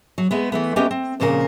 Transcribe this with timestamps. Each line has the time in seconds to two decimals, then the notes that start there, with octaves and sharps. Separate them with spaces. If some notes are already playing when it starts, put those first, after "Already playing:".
0.18 F#3
0.31 G#3 A3 B3
0.52 E3 A3 B3
0.76 A3 B3 C#4 G4 D#5 G5
0.91 C4
1.20 F2 A#2 C#3 G4 A#4